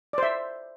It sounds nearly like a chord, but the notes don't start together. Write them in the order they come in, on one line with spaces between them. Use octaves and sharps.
D5 C5 E5